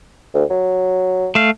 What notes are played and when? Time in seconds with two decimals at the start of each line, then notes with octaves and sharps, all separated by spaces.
0.34 D2
0.50 F#3
1.35 A3 F5